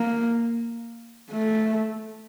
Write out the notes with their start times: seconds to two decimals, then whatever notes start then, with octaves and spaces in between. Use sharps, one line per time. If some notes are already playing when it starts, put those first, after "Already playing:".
Already playing: A#3
1.31 A3